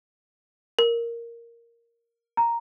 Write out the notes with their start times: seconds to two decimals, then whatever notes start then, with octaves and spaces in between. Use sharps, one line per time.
0.79 A#4
2.37 A#5